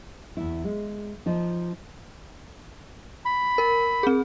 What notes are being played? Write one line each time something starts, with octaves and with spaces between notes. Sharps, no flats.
E2 E4
G#3
F3 D#4
B5
A#4
C4 G#4